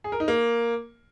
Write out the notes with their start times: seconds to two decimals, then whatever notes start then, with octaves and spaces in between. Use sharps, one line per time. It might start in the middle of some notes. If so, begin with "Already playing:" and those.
0.04 G#4
0.12 A#4
0.20 D#4
0.28 A#3